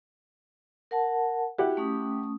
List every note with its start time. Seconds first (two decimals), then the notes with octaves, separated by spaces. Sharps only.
0.91 A#4 F#5 A5
1.58 E4 F#4 G4 F#5
1.77 A3 C#4 D#6